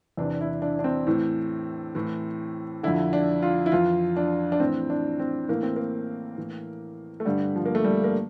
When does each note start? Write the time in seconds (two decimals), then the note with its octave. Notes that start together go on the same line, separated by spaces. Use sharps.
0.17 E2 C3 E3 D4
0.41 E4
0.62 D4
0.79 D4
0.84 C4
1.07 A2 E3
1.95 A2 E3
2.83 F2 D3 E4
3.13 D4
3.42 F4
3.66 E4
3.72 F2 E3 F4
4.17 D4
4.52 D4
4.60 A2 E3 C4
4.90 D4
5.20 C4
5.48 A2 E3 A#3
5.63 C4
5.76 A#3
6.38 A2 E3
7.20 A3
7.25 G2 D3 G3
7.56 F3
7.66 A#3
7.75 A3
7.84 G3
8.04 A#3